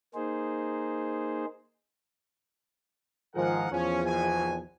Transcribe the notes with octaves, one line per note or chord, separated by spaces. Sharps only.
A#3 D#4 G#4 C5
G#2 D#3 F3 G#4 A#4 F#5
E2 F3 C#4
G#1 B2 G#5